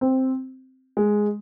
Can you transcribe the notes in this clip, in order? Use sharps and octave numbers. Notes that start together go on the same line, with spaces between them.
C4
G#3